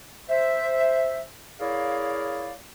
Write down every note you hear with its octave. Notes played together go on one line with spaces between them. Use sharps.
C5 E5
E4 G#4 A#4 C#5 D5 F5